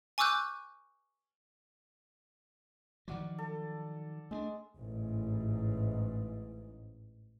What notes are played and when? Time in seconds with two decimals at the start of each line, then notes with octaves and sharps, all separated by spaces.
0.18 G#5 C#6 D6 E6 F#6 G6
3.08 D#3 F3 F#3 D5 F#5 D6
3.38 A4
4.31 G#3 A3 C#4 D4
4.74 A1 G#2